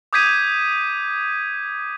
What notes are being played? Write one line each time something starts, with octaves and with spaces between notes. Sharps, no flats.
D6 D#6 G6 G#6 B6 D#7